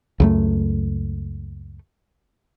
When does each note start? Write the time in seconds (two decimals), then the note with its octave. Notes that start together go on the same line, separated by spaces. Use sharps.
0.20 C#2 F#2 A3